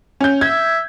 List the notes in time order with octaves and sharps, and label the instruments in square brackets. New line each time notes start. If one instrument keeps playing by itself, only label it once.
[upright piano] C#4 G6
[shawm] E5 [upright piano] G#6